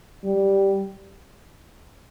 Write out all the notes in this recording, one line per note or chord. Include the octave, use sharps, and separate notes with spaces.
G3